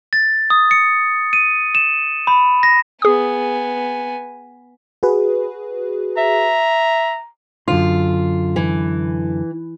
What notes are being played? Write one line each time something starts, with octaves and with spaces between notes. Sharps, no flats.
A6
D#6
C#7
D#7
E7
B5
A#6
B3 G#4 G#5 D#6
F#4 G#4 B4
E5 A#5
F#2 D3 F4 C6
E3